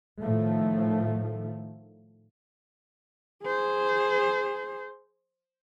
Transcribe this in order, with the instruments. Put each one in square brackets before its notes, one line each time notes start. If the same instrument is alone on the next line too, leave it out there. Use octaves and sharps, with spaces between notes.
[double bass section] A2 D#3 F3 A3
[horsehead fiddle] G#4 C5